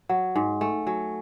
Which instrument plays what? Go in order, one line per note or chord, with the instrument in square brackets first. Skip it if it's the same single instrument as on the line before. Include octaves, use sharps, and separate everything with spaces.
[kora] F#3 [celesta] F#5
[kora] G#2 [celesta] G#5
[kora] A3 [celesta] G#5
[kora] F#3 [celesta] G#5